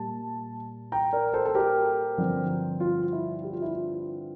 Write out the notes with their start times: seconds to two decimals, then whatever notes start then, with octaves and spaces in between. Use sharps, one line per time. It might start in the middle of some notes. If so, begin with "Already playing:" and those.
Already playing: A#2 G3 A#3 A5
0.92 G5 A#5
1.13 A#4 D5
1.34 A4 C5
1.45 A4
1.55 G4 A#4
2.18 G2 D3 F3 C4
2.80 F4
3.13 E4
3.44 G4
3.53 F4
3.62 E4
3.71 F4